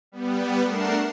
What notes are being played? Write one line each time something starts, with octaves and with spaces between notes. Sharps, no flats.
G3 B3
A3 D4 A#4 F#5 C7 E7